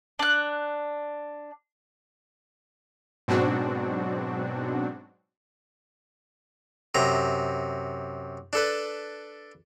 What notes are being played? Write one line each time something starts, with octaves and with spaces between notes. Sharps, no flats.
D4 F#6
G#2 B2 F#3 C4 D4 F#4
F#2 C3 A#5
D4 A4 B4